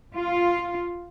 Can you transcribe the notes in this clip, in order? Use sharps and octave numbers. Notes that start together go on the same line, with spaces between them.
F4